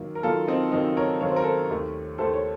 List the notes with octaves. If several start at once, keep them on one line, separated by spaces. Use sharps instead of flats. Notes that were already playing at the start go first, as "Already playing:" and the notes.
Already playing: F#2 D#3 A#3
A#4
F#2 D#3 A#3 F4 A4
C4 D#4
F#2 D#3 A#3 C4 D#4
A#4 C#5
F#2 D#3 A#3 C#5
C5
A#4
A4 C5
D#2 D#3 A3
D#2 D#3 A3 A4 C5
C#5